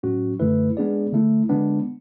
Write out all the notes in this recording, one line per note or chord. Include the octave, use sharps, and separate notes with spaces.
A2 F#3 C#4 F#4
F#2 D3 A3 E4 B4
G#3 B3 D4 G#4 D5
D3 A3 E4
D3 G#3 B3 D4